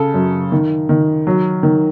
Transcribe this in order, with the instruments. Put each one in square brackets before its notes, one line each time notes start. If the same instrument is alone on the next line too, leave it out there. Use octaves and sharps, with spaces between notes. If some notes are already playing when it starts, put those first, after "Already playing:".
Already playing: [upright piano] C#3 A4
F#2
D#3
D#3
F#3
D#3